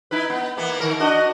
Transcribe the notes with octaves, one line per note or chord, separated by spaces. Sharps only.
D#4 E4 B4
B3
E3 A#3 B3
D#3 A#4
D4 F#4 D#5